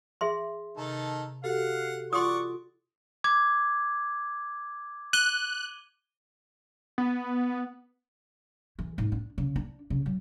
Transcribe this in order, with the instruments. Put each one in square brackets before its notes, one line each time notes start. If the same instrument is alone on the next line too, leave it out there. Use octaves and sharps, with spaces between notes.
[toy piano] G#4 E5 C6
[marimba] C3 [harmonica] D#3 A4 A5
[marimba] F#4 G4 A4 [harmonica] F5 F#5
[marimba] F4 [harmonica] D5 F#5 C#6 [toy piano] C6 D#6
[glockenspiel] D6 G#6
[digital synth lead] F#6 [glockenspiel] D#7 G7
[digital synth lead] B3
[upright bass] E3
G#2
D4
C#3
D4
C#3
F#3